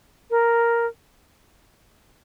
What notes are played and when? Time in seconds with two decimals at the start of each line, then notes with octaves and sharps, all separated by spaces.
0.31 A#4